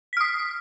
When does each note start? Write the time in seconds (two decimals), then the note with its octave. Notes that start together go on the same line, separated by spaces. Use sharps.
0.13 B6
0.17 F6
0.21 D#6